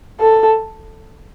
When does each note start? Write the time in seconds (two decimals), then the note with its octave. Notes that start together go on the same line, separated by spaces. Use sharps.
0.21 A4